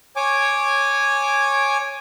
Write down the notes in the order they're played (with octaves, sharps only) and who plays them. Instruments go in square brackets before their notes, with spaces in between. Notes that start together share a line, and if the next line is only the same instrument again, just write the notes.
[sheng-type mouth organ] C#5 G#5 D6